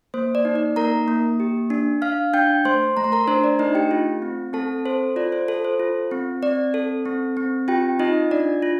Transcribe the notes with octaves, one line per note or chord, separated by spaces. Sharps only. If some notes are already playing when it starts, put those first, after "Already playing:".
A#3 C5
D5
D#4
D5
A#3 A#4 A#5
A#3
G4
D4
D4 F5 F6
D4 G5 G6
A3 C5 C6
A3 A#5
C6
A#4 A#5
D4 C5
D5
A3 D#4 D#5
G4 G5
F4
C4
C4 A4 A5
A4 C5
F4 D5
C5
A4
C5
F4
C4
C4 D5
A4
C4
C4
F4 G4 G5
D#4 F4 D#5
D4 D5
F4